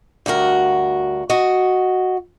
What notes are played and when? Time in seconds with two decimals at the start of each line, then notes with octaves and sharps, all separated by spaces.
0.26 D2 G2 F#4 A#4
1.30 F#4 D#5